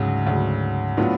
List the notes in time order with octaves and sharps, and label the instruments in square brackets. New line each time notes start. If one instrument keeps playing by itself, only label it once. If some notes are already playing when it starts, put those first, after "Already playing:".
Already playing: [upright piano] D2 C#3 F#3 [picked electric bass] G#2
[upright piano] D2 C#3 F#3
A2 F#3 B3 D4 F4